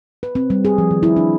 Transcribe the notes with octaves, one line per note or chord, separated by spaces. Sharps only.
B4
C4
G3
G#4
F3
D#3
E4
D4